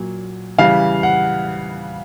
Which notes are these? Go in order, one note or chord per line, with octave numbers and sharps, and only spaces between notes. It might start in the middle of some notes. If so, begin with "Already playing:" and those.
Already playing: A#2 F#3
C#3 E3 G3 F5
F#5